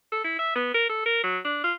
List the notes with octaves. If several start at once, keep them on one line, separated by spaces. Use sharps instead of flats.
A4
E4
E5
B3
A#4
A4
A#4
F#3
D4
F4